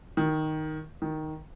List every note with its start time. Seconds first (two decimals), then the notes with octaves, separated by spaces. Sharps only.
0.17 D#3
1.02 D#3